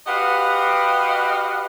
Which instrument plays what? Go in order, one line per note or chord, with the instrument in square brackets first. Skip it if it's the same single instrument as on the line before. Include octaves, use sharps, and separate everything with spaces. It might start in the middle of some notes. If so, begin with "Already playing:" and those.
[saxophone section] F#4 G4 B4 D#5 F5 F#5